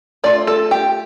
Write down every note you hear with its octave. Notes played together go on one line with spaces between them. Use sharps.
A3 F4 D5
A4
G4